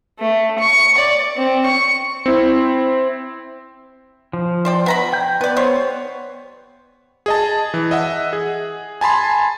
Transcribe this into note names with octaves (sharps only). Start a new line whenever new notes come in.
A3
C#6
D5
C4
C#6
C4 E4
F3
C5 D5 G5
B3 A#5 B5
G5 G6
B3 B4 D5
G3 C5 C#5
G#4 D#5 A5
E3
D#5 E5 F#5
G#4
G#5 A5 B5 C6